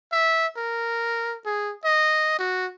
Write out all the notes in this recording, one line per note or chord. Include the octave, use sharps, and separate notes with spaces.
E5
A#4
G#4
D#5
F#4